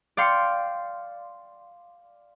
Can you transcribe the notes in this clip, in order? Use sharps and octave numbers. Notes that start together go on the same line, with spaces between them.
D5 F5 G5 C6 C7 C#7